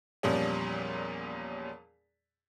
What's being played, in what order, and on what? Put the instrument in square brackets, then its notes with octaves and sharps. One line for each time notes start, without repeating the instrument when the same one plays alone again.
[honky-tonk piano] E2 A#2 F3 G3 C#4